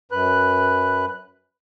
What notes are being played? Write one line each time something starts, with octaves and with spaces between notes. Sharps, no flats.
F#2 B4 F#6